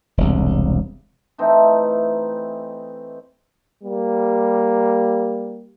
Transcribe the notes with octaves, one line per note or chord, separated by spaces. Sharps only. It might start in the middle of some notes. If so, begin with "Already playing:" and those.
E1 C2
E3 A3 C4 D#4
G3 A#3